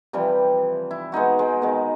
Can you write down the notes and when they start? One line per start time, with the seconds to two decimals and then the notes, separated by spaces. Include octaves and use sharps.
0.13 C3 E3 F3 G3
0.91 E4
1.12 G#3 B3 D#4 F#4
1.39 G#3
1.62 D#3 G#3 B3